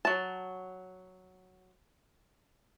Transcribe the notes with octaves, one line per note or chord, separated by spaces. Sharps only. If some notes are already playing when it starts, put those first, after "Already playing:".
F#3 A5